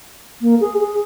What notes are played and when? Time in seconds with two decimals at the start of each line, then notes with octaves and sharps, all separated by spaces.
0.42 A#3
0.61 G#4
0.80 G#4